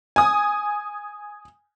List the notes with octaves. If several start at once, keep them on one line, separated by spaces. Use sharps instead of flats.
G#5 D#6